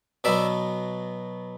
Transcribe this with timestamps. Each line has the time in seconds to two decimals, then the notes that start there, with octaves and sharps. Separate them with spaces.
0.24 B2 F#3 B3 D5 E5